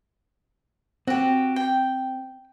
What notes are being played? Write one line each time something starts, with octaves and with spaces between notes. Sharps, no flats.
C4 F#4 G4
G5